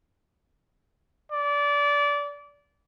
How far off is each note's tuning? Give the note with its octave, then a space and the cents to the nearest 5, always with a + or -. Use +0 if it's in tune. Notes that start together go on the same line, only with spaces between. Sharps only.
D5 -25